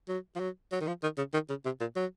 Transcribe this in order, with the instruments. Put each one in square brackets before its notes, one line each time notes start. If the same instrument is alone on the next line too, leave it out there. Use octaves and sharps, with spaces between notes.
[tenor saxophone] F#3
F3
F#3
F#3
D#3
F3
D#3
C#3
D#3
C#3
C3
A#2
F#3